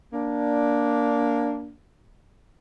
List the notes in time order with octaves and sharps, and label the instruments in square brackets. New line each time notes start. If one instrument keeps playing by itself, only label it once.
[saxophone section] A#3 D4